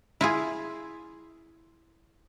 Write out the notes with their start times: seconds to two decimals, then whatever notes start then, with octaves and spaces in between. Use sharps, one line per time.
0.21 E4 F4 G#4